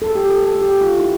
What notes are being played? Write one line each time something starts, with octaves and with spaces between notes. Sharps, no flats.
A4
G4
A4
A4
G4
F4
E4